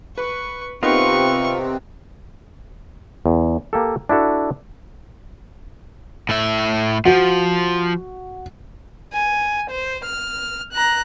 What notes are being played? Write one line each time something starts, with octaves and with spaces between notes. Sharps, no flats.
B4 C#6
C3 B3 C4 D#4 F4 A#4 B4 C#6
E2
A#3 G4 A4
D4 E4 F#4 A4
A2 E5
F3 F#4
G#5
C5
F6
A#5 F#6